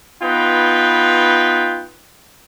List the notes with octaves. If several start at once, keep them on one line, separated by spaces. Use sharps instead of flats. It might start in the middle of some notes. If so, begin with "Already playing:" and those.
B3 D#4 F4 B4 G5